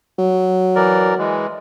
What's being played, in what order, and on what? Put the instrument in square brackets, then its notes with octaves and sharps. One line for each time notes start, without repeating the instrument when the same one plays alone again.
[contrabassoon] F#3
[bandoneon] E3 A#4 D5
E3 G#3